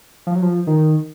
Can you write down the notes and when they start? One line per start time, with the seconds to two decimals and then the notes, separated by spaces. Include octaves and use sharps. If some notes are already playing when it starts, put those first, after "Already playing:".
0.27 F3
0.35 F#3
0.42 F3
0.67 D#3